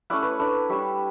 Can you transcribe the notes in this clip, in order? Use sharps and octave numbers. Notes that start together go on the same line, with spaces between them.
A3 C#4 E4 D5 F#5
B4
C#5
A3 D4 B4 D5
G3 D4 C#5 E5